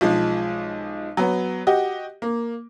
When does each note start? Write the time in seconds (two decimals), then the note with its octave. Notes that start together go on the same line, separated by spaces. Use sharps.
0.01 B1 F3 G#3
1.17 F#3 B3
1.67 F#4 G4 D#5
2.22 A#3